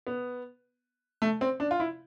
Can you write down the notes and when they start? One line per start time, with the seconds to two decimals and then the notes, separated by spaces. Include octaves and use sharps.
0.07 B3
1.22 A3
1.41 C4
1.60 D4
1.71 F4
1.80 E4